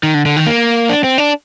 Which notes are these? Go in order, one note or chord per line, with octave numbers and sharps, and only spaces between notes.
D#3
D3
D3
D#3
A#3
D4
C4
D4